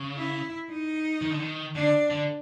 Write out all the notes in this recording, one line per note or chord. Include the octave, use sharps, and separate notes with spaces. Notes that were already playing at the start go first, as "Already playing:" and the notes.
Already playing: C#3
E4
D#4
D#3
D3
D#3
D3 D4
D3